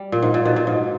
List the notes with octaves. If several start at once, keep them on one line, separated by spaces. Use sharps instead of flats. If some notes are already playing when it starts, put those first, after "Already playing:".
Already playing: G3
A#2
G#2
A#2
B2
A#2
G#2